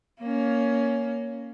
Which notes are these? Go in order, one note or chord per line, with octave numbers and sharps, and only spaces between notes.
A#3 C#4